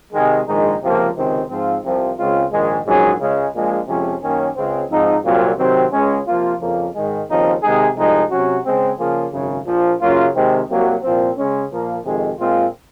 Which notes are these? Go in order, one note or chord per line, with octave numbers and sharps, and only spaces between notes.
C3 D#3 G#3
A#1 G#2 D#3 G#3 D#4
C#2 C3 F3 A#3
C#2 C3 D#3 G#3 C4
G#2 F3 C4 F4
C2 C3 F3
C#2 C#3 G#3 C4 F4
A#1 G#2 D#3 G#3
A#1 G#2 F#3 C#4 G#4
C#2 C#3 G#3
A#1 A#2 F3 G#3
F2 C3 F3 G#3 C#4
F#2 D#3 A#3 C#4
C#2 C#3 G#3 C4
G#2 F3 C4 D#4
C2 A#2 F#3 C4 F4
C3 D#3 F#3 C4
C#2 C#3 G#3 C#4
C3 F3 A#3 F4
F2 C#3 F3 A#3
G#2 D#3 G#3
D#2 C#3 F3 C4 D#4
C3 D#3 G#3 D#4 G#4
C2 C3 F3 G#3 D#4
C3 F#3 C#4 F#4
C#3 G#3 C4
C#3 F3 A#3 F4 G#4
G#1 F#2 C#3
A#1 A#2 F3
F#2 C#3 F#3 A#3 F4
C3 D#3 G#3 C4
C2 C3 F#3 A#3
C2 A#2 F3 C4
C#3 G#3 C#4
A#2 F3 A#3
F2 C3 D#3 G#3
A#2 G#3 C4 F4